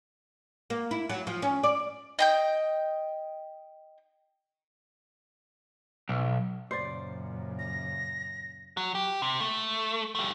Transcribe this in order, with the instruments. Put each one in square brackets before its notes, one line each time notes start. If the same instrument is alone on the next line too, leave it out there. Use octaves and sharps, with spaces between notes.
[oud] A#3
E4
F#3
F3
C#4
D5
[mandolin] D#5 G5 G6
[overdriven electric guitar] B1
[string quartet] F#2 [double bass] A#2 C#3 [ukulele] C5 D5
[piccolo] A#6
[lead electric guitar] F#3
G4
C3
A3
G3 A3